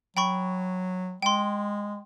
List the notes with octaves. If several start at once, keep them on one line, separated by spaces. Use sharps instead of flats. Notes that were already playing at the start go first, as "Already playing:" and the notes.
F#3 G5 B5 C#6
G#3 G5 C6